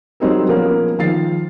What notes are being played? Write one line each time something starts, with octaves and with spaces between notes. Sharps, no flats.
F#3 G3 C4 D#4 G#4 A#4
F3 A#3 B3 C#4
D#3 F3 F5 A6 C7